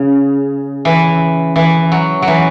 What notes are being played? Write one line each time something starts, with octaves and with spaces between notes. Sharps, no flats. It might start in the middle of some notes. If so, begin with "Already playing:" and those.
Already playing: C#3
E3
E3
F#3
F#3
E3